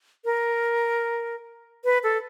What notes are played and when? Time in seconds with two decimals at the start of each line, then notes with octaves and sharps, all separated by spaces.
0.25 A#4
1.84 B4
2.04 A4